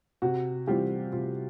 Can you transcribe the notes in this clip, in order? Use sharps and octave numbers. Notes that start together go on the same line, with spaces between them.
C3 F#4
E3 G3 C4 F4 G4
C3 F4